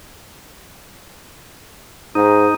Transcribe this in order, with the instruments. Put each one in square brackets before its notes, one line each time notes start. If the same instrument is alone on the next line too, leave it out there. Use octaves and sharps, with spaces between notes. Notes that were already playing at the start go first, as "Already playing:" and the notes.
[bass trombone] G#2 [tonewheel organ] D#4